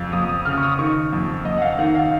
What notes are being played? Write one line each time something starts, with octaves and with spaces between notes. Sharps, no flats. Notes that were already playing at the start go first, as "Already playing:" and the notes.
Already playing: F2 C#3 F5
F2 D#6
D#6
C#3 F6
C#6
D#6
D#3 C#6
F2
F2 D#5
F#5
F5
D#3 F#5
F5